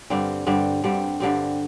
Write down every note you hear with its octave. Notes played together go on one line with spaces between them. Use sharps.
G2 D3 G3 C4
G2 D3 G3 C4
G2 D3 G3 C4
G2 D3 G3 C4